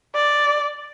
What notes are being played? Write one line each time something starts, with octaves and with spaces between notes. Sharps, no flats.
D5